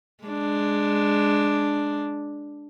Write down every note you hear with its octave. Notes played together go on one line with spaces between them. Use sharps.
G#3 D4